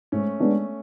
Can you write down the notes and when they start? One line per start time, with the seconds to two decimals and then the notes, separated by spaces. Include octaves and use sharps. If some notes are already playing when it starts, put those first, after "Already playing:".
0.12 G#2 A3 C#4
0.40 G#3 B3 D4